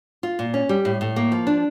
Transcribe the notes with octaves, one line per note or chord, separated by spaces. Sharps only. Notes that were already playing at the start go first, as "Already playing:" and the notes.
F4
A#2
C#4
G3
A2
A2
A#3
F3
D4